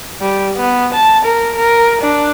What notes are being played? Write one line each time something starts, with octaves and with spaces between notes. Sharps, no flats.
G3
B3
A5
A#4
A#4
D4